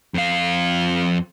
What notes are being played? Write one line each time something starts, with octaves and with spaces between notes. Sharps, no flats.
F2 F5